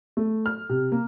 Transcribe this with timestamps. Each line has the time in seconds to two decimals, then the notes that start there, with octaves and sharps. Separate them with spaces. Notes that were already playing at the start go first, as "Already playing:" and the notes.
0.17 A3
0.46 F6
0.69 C3
0.92 A#3